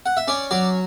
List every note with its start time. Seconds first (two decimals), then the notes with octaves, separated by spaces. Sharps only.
0.06 F#5
0.17 E5
0.28 C#4 D5
0.51 F#3 D5